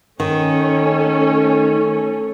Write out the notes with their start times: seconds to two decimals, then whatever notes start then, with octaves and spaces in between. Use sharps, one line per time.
0.20 D#3 A3 C#4 A4